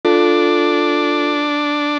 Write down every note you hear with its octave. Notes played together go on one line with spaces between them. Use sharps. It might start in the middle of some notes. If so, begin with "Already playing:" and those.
D4 F4 A4